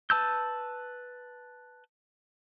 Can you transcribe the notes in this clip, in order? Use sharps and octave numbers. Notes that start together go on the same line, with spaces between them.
B4 A5 E6 G6